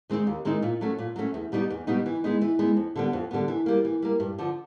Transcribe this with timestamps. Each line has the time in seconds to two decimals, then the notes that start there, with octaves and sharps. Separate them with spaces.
0.10 D#3 G#3 C4 D#4
0.27 D#2
0.45 D#3 G#3 C4 D#4
0.62 A#2
0.81 F#3 A3 C#4
0.98 A#2
1.16 F#3 A3 C#4
1.34 E2
1.52 B2 G3 B3 D#4
1.70 E2
1.87 B2 G3 B3 D#4
2.06 E3
2.24 G#3 B3 D#4
2.41 E3
2.59 G#3 B3 D#4
2.76 F2
2.96 D3 G3 B3
3.13 F2
3.31 D3 G3 B3
3.48 E3
3.66 G3 A#3
3.85 E3
4.02 G3 A#3
4.20 G2
4.38 D3 F3